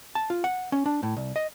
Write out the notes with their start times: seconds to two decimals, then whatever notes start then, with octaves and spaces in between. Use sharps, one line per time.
0.15 A5
0.30 F4
0.44 F#5
0.72 C#4
0.86 D4
1.03 A2
1.17 C2
1.36 D#5